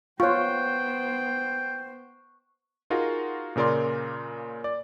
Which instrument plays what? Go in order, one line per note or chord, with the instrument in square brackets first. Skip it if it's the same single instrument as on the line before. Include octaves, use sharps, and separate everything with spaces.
[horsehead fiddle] B3 C5 [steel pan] F4 C#5 [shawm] G5 [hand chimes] C#6 F#6
[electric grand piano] D#4 F4 F#4 G#4 A#4
A#2 C#3 A#4 D5 C6
D5